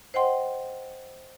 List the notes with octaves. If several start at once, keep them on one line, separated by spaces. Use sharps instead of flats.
C5 D#5 F#5 G5 C6